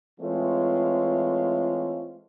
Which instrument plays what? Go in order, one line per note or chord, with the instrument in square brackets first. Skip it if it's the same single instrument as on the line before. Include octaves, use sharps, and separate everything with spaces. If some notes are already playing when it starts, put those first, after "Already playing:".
[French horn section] E3 G#3 A3 C4 F4 C#5